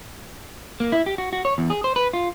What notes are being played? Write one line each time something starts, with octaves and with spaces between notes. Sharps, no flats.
A#3
E4
G4
F#4
F#4
C#5
E2
G#4
C5
B4
F4